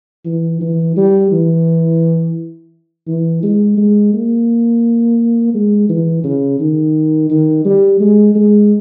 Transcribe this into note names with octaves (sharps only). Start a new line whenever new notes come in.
E3
E3
G3
E3
E3
G#3
G#3
A#3
G#3
E3
C#3
D#3
D#3
G3
G#3
G#3